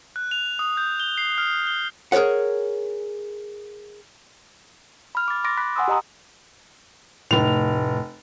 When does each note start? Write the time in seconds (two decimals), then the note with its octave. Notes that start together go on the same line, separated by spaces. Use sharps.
0.16 F#6
0.31 F7
0.59 D#6
0.77 G6
1.00 G7
1.18 C7
1.38 F6
1.67 G7
2.12 G#4 A#4 C5 C#5 F#5
5.15 B5 F6
5.28 D6 A6
5.44 C6 D6 A6 A#6 D7
5.57 B5 F#6 B6
5.76 F#5 G#5 C6 D#6 E6
5.88 G4 D#5 A#5 D#6
7.31 F1 A2 F7